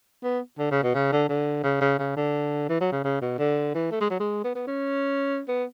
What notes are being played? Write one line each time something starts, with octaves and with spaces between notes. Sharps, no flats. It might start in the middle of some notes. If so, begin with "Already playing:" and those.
B3
D3
C#3
B2
C#3
D3
D3
C#3
C#3
C#3
D3
E3
F#3
C#3
C#3
B2
D3
E3
A3
G#3
F#3
G#3
B3
B3
C#4
B3